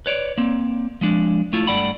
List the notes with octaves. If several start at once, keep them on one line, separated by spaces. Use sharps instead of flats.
B4 C#5 D5
A#3 C4
F3 G#3 D4
A3 E4 F4
G2 A3 D5 F#5 B5